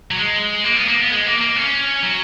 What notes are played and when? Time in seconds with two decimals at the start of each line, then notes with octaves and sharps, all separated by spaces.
0.11 F#3
0.18 G#3
0.64 A#3
0.76 B3
0.88 A#3
0.98 B3
1.10 G#3
1.26 A#3
1.41 A#3
1.56 C#4
2.03 F#3